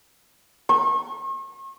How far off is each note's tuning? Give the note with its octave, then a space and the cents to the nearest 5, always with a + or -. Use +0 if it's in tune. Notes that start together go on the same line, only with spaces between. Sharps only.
C#6 -45